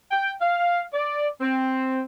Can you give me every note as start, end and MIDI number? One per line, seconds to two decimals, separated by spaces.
0.11 0.33 79
0.41 0.83 77
0.94 1.27 74
1.41 2.01 60